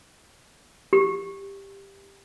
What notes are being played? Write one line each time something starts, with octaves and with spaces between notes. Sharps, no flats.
G4